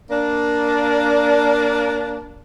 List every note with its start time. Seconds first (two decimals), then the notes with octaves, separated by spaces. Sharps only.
0.09 A#3 D4